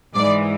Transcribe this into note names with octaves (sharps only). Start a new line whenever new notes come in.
G#2 E3 D5